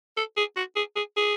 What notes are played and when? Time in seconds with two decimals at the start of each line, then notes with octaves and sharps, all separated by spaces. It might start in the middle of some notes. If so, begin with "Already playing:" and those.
0.17 A4
0.37 G#4
0.56 F#4
0.76 G#4
0.96 G#4
1.17 G#4